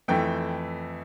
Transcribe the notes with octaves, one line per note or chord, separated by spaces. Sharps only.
F2 E3 A3 G5